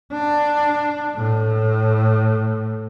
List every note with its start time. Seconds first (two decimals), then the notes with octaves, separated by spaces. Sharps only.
0.12 D4
1.15 A2